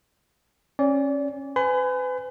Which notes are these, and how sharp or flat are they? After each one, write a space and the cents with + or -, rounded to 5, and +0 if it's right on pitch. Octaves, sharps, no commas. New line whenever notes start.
C#4 -20 D5 -30
B4 +40 G#5 +0 B5 +40